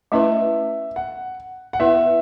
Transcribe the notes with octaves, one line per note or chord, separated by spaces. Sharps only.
A3 C#4 E4 B4 E5
F#5
F#5
B3 E4 B4 E5